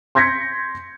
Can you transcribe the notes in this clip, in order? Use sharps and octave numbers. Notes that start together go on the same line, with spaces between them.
C6 G6 G#6 A#6 B6 C#7